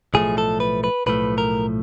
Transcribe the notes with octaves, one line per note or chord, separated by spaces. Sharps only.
B1 A2 F3 A3 G#4
A4
B4
B4
B1 A2 F3 A3 B4
A#4